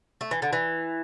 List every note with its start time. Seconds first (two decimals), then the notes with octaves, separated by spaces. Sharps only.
0.21 A3
0.31 E3
0.42 D3
0.53 E3